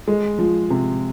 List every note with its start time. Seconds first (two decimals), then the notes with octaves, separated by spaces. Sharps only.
0.08 G#3
0.39 F3
0.70 C3